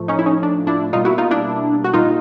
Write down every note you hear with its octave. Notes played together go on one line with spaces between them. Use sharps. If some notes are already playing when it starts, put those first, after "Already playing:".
Already playing: A2 F3 A3
C#4 D#4
E4
C#4 D#4
D4
D4 E4
B2 G3 A#3 D#4 F4
E4 F#4
D#4 F4
D4 E4
F#4
A#2 G3 A#3 D#4 F4